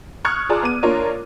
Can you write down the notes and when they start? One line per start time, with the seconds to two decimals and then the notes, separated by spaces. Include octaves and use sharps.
0.25 C#6 D#6 F6 F#6 G#6 C#7
0.49 F4 G#4 D5 A5 A#5 D6
0.63 B3 D#7
0.83 A#3 D4 F4 A#4 C#5